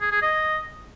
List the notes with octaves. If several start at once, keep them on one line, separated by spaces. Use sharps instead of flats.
G#4
G#4
D#5